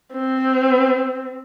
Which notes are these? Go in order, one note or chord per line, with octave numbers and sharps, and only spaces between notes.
C4